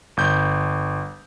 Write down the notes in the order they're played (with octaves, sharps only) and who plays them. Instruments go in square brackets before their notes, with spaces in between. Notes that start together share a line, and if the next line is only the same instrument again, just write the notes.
[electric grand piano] G1 G6